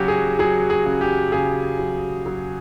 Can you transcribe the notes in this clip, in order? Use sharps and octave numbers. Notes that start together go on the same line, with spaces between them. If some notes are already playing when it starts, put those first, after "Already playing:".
Already playing: C#3 F#3 F#4 G4
G#4
F#3 G#4
G#4
C#3
G4
C#3 G#4
F#3
F#3